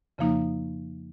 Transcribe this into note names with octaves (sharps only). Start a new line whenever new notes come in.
F2 C#3 F3 A#3 D#4